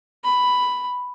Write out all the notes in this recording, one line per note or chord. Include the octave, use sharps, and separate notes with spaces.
B5